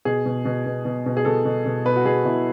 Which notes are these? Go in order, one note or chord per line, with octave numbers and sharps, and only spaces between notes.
B2 G#4
B2
B2
B2
B2
B2
G#4
B2 A4
B2
B2
B2 B4
F#4
B2 G#4
B2 E4